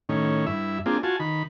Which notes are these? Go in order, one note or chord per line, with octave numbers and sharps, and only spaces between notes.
A2 D#3 C#4
G2 E4 E5
A#3 C4 D4 F4 G#4
F4 F#4 G#5 A5
D#3 B5